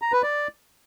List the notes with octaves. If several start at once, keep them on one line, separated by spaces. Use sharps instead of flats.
A#5
B4
D5